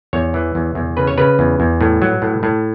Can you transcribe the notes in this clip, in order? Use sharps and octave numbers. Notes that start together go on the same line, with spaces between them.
E2 C#5
E3
E2
E2
C#3 B4
C#5
C#3 B4
E2
E2
A2
F#3
A2
A2